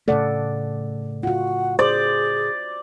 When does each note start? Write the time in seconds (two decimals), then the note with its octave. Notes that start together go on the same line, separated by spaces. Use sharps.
0.08 A2 C#3 A3 A4 D5 F#5
1.23 F4 F#4 F#5
1.79 G#4 C5 D5